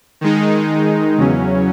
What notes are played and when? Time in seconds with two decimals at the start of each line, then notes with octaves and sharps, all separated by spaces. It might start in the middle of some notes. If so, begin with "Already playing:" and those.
0.21 D#3 G#3 D#4
1.18 E2 C#3 F#3 C#4